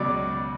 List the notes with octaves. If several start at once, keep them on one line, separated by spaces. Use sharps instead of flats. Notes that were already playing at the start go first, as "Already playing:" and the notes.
Already playing: C#2 B2 F#3 D5